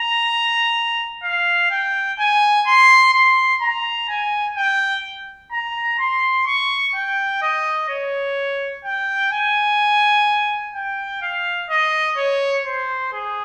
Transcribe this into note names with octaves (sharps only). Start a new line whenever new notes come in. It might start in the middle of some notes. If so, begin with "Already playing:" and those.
Already playing: A#5
F5
G5
G#5
C6
C6
A#5
G#5
G5
A#5
C6
C#6
G5
D#5
C#5
G5
G#5
G5
F5
D#5
C#5
C5
G#4